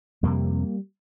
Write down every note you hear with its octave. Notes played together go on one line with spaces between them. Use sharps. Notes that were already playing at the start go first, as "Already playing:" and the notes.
F2 C3 G3 A#3